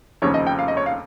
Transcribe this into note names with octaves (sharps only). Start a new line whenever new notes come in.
F1 D#2 C#3 F3 C#5
D#5
G5
F5
D#5
C#5
F5